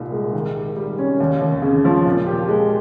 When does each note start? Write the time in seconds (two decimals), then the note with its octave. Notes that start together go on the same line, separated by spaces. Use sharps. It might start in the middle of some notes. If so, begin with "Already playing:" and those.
Already playing: C2 A#2 D#4
0.12 G#3
0.33 D#3
0.54 G4
0.77 G3
0.99 C#4
1.20 D#2
1.41 D#2
1.62 C#3
1.85 F3
2.06 A#2
2.26 G4
2.49 G#3